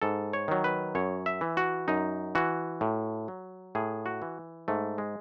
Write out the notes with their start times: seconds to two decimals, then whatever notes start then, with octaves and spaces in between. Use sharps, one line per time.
0.02 G#2 A4
0.33 C#5
0.48 D#3 F#3
0.64 B4
0.95 F#2 C#5
1.26 E5
1.41 E3
1.57 F#4
1.88 F#2 D#4
2.35 E3 F#4
2.81 A2
3.28 F#3
3.75 A2 G#4
4.06 F#4
4.22 E3
4.68 G#2 A3
4.98 G#3